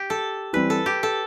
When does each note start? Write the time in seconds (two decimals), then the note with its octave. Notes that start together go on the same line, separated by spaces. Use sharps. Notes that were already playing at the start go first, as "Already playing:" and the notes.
Already playing: G4
0.10 A4
0.53 E3 G3 C4 B4
0.70 A4
0.86 G4
1.03 A4